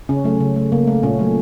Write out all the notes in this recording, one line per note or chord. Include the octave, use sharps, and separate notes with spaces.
C#3 C#4
F#3 A3
C#3
A3
C#3 A#3
A3
A#2 C#4
F#3 A3